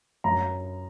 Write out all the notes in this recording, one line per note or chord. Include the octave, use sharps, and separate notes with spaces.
F#2 A#5